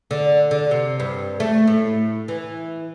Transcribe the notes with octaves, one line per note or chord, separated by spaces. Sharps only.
D3
D3
C3
G2
A3
A2
E3